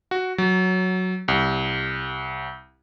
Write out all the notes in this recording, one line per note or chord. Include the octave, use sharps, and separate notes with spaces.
F#4
F#3
C2